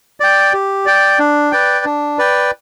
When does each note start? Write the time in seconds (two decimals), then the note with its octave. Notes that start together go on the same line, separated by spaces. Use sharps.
0.20 D5 G5
0.53 G4
0.86 D5 G5
1.19 D4
1.52 B4 D5 G5
1.85 D4
2.18 B4 D5 G5